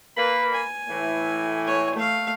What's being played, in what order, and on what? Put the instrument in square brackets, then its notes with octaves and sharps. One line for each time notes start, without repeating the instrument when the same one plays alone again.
[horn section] A#3 B5 [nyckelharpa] B4
[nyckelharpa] G#5
[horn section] A2 E3
[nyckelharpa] C#5 G#5
A3 F5